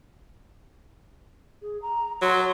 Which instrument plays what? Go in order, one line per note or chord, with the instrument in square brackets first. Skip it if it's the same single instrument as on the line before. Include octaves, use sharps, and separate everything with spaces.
[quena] G#4
A#5
[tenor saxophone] F#3 [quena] C6